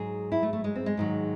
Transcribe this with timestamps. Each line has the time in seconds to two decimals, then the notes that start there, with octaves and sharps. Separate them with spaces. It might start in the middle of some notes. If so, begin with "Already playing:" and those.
Already playing: G#2 F#3 G#4
0.32 E4
0.43 A3
0.53 A3
0.64 G#3
0.75 C4
0.86 G#3
0.97 G#2 D#3 F#3